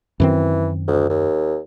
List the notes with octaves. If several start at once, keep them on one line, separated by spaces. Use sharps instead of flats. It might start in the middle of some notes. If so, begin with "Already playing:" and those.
F#2 D#3 E3 C4
D2
D#2